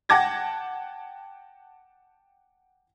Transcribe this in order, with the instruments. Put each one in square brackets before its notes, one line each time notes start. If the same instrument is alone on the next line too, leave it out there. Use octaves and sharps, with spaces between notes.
[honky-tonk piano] F#5 G5 A5 D6 G#6 A#6